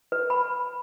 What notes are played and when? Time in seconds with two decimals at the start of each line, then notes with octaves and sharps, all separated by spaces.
0.12 B4
0.30 B5